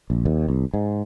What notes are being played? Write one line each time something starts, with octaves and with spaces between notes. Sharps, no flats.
A#1
D#2
C2
G#2